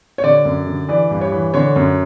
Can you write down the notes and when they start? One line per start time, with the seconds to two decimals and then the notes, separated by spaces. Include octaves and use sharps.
0.18 C#5
0.24 D3 D5
0.45 F#2
0.67 D3
0.89 E3 D5
1.11 G2
1.21 C#5
1.32 E3
1.54 D3 C#5
1.76 F#2